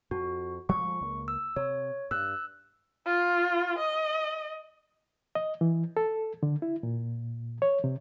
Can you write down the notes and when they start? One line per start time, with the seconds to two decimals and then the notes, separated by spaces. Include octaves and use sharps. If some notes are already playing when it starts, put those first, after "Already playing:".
0.11 F2 F#4
0.69 F3 G#3 A3 C#6
1.01 C#2 A#3
1.28 E6
1.56 C3 C#5
2.11 G2 E6 F#6
3.06 F4
3.79 D#5
5.35 D#5
5.61 E3
5.97 A4
6.43 D3
6.62 E4
6.83 A#2
7.62 C#5
7.84 C3